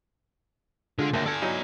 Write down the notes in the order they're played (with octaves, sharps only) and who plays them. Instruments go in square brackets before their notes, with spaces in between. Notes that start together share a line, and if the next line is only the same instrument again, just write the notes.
[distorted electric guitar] D3 [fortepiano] G#3 F4
[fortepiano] D2 [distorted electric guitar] A#3 E4
[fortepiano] A4 [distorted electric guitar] D5 G#5
[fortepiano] F#3 D#4 E4